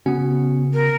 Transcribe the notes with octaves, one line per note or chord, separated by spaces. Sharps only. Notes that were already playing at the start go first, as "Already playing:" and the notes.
C#3 B3 C#4 F#4
A#4